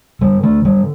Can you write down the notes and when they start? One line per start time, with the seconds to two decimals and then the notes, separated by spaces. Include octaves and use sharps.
0.21 D3 G3
0.43 A3
0.65 D3 G3